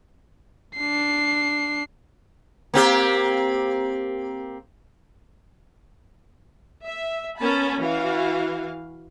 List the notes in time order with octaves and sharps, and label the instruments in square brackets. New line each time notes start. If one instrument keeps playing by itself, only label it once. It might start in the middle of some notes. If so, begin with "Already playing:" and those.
[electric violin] D4 C7
[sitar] A#3 C4 G4
[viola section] E5
B3 C#4 A#4 A5 B5
E3 F#4 F5